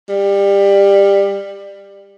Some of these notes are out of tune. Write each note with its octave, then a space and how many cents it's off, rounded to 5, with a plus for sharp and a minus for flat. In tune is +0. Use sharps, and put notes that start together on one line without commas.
G3 +20